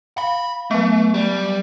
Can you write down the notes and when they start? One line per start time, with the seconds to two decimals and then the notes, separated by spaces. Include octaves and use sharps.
0.18 F5 B5
0.71 F#3 A3 B3
1.14 G3